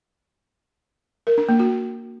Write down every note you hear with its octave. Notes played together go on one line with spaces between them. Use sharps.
A#4
D4
A#3
F#4